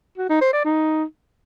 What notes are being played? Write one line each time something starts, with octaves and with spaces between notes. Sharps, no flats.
F#4
D#4
C5
D5
D#4